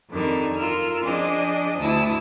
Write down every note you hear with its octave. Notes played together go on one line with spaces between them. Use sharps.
F2 D3 D#3 G3
F4 A#4 E6 F6
F3 D4 G#4 C5 D5 D#5
D2 E4 A5 D#6 E6